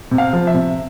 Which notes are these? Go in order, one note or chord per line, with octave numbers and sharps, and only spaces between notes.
C3
F5
F3
E5
C3